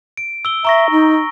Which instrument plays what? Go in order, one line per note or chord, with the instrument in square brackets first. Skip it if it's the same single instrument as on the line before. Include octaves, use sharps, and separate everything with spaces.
[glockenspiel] D7
E6 G7
[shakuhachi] E5 [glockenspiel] A#5 C#6 A#6
[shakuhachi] D#4